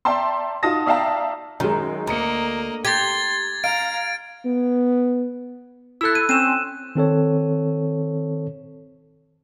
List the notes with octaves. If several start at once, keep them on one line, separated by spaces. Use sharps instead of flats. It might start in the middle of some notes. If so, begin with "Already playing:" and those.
D5 E5 G5 A5 A#5 C6
D#4 F4 F#4 A5 D#6 A#6
D5 E5 F5 G5 A5 A#5
F#2 D#3 G#3
D2 A#3 D#5 A#5 C#7
G4 C6 G#6 A6
F5 A#5 D7
B3
E4 A4 E6 F#6
D#7
C4 C#4 D#7 E7
D#3 C4 A4 C#5